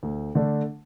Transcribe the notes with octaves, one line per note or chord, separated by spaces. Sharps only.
D2
D3 A3 D4